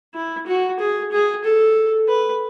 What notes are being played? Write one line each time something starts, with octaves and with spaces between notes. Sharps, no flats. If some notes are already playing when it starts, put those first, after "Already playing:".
E4
F#4
G#4
G#4
A4
B4